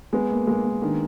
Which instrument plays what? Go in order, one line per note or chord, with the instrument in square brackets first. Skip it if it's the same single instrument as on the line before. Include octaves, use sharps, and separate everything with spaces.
[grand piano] G#3 [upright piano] B3
[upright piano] A#3
[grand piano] G#3 [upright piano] A#3
[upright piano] A#3
[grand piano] D#3 [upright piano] D4